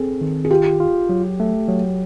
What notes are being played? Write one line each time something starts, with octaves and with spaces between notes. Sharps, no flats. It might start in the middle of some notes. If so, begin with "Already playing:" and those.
Already playing: C4 G#4 A4
D#3
G#4
F4 G4
F4
F#3
A3
F#3